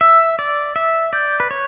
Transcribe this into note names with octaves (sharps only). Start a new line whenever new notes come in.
E5 E6
D5
E5
D5 G6
B4
C#5